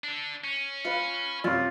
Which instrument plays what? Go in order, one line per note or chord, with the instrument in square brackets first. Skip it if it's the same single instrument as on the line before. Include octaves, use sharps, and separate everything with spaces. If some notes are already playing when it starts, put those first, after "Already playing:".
[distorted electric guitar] D4 A4
C#4
[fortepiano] F4 B4
[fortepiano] F#2 C3 [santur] F4